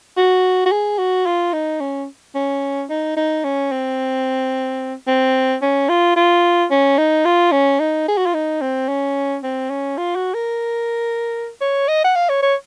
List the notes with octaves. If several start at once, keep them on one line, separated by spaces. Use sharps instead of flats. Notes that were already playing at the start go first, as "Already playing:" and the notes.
F#4
F#4
G#4
F#4
F4
D#4
C#4
C#4
D#4
D#4
C#4
C4
C4
C#4
F4
F4
C#4
D#4
F4
C#4
D#4
G#4
F#4
F4
D#4
C4
C#4
C4
C#4
F4
F#4
A#4
C#5
D#5
F#5
F5
C#5
C#5